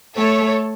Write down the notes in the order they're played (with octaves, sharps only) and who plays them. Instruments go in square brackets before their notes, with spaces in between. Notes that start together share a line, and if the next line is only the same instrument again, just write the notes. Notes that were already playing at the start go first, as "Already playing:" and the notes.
[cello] A3 [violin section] A4 C#5